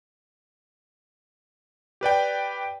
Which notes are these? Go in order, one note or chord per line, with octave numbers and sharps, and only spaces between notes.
G4 B4 D5 G5